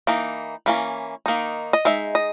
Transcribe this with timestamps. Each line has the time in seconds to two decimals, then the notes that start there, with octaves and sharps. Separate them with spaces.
0.07 E3 A#3 D#4
0.66 E3 A#3 C#4
1.26 D#3 A#3 D#4
1.73 D#5
1.85 G#3 D#4 E5
2.15 D#5